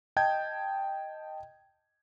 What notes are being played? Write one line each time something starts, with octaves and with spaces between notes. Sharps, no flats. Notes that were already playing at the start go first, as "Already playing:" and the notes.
D#5 G5 A5 G6 G#6